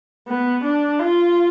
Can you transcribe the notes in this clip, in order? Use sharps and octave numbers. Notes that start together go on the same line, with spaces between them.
B3
D4
F4